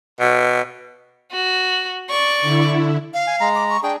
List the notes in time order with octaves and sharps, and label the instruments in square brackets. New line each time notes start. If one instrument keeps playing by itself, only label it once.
[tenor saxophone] B2
[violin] F#4
D5 C#6
[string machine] D3 E4
[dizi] F5
[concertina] G#5
G#3 A#5
[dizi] D6
C#6
[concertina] D4 G#4 [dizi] G5